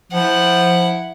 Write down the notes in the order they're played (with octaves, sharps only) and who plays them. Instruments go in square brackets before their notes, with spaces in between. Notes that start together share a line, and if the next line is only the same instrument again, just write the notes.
[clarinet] F3 [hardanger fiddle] E4 F#5